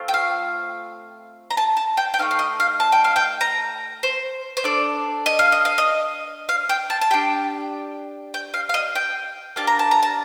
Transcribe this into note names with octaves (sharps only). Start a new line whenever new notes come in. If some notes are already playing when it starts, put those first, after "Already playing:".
Already playing: A3 C4 F4
G5
F5
A#5
A5
A5
G5
G5
A3 C4 D#4 F5
F5
D#5
F5
A5
G5
F5
G5
A#5
C5
C5
D4 A4 D5
D#5
F5
D#5
F5
D#5
F5
G5
A5
A5
D4 G4 G5
G5
F5
F5
D#5
G5
A#3 D4 G4 A5
A#5
A5
A#5
A5